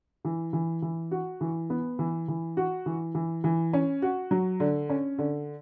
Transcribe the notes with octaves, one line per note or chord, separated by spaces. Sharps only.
E3
E3
E3
F#4
E3
B3
E3
E3
F#4
E3
E3
E3
C#4
F#4
F#3
D3
C#4
D3